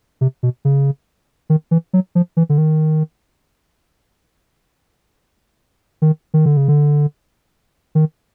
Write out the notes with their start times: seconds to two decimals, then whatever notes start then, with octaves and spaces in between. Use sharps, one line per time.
0.21 C3
0.43 B2
0.65 C#3
1.50 D#3
1.71 E3
1.93 F#3
2.15 F3
2.37 E3
2.49 D3
2.58 D#3
6.02 D#3
6.34 D#3
6.46 D3
6.57 C#3
6.68 D3
7.95 D#3